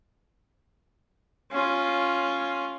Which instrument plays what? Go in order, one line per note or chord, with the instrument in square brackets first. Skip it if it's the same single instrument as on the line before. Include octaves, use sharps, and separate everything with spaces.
[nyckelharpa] C#4 F4